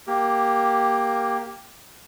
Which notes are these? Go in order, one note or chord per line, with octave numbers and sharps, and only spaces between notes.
A#3 G4